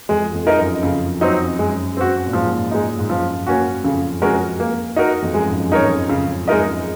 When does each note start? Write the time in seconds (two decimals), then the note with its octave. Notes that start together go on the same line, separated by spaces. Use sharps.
0.09 F2 G#3
0.33 F2
0.47 D#4 A#4 D#5
0.59 F#2
0.83 F2 C#3
1.21 F#3 C4 D#4
1.58 F#2 G#3
1.97 C4 F#4
2.26 A#2
2.33 G#2 F3
2.71 G#3 D#4
2.99 G#2
3.08 F#2 F3
3.47 A#3 C#4 F#4
3.84 F2 C#3
4.22 G#3 C#4 F#4 A#4
4.60 A#3
4.96 D#4 F#4 A#4
5.22 F2
5.34 F#2 G#3
5.47 G#2
5.60 F#2
5.72 F#2 D#4 A#4 C#5
5.85 F2
6.09 C#3
6.48 G#3 D#4 A#4 D#5